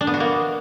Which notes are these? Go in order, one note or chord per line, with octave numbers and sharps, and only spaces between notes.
D4
B3
F#4
A#3